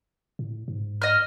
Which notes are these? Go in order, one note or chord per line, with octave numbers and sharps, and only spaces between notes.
A2
G#2
D#5 F6